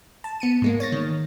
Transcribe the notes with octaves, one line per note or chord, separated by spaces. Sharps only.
A5
B3 C#7 D#7
G#2 G#3 A#3
C#5 A6 A#6
D#3